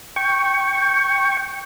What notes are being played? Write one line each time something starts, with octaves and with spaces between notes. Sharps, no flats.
G5 C#6